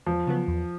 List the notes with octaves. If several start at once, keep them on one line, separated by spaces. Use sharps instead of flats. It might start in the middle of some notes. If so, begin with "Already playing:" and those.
E2 F3
C#3 F#3 B3
E2